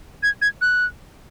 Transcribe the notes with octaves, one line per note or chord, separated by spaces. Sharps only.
G#6
G#6
F#6